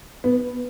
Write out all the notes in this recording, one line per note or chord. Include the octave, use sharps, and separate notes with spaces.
B3